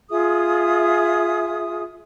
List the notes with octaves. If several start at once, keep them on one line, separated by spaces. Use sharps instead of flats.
F4 G#4 E5 D#6